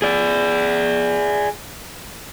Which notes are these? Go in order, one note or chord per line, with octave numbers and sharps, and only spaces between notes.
G#4 D5